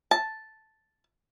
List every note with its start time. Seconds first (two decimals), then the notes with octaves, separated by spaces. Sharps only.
0.11 A5